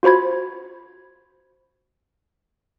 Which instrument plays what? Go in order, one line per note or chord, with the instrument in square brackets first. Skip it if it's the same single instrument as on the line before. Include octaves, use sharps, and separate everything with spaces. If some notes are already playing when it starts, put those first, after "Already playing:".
[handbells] F4 F#4 C5 B5 G#6